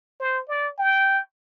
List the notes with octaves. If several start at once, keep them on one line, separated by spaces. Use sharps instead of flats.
C5
D5
G5